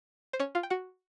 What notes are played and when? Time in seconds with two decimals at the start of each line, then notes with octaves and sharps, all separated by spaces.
0.33 C5
0.40 C#4 C#5
0.55 F4 F5
0.63 G5
0.70 F#4 F#5